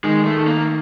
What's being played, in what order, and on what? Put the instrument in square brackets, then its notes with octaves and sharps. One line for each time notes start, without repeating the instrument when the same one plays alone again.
[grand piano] D#3 [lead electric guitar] G#3
[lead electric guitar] A3
[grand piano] D#3
[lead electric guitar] A#3